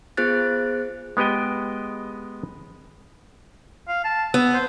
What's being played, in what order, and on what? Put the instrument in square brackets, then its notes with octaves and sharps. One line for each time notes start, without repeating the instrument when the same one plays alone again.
[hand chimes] B3 F4 G#4 C5 F#6 A6
[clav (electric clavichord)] G#3 B3 G4 D#5 G5
[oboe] F5
A5
[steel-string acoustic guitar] B3 [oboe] E6
[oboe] C5